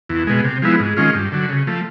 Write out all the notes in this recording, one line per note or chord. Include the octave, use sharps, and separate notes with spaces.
E2
B2 G#3
C3
F3 G#3 B3 E4
G#2
D#3 G#3 C#4 F4
G2
D3 F#3
C#3
F3 A3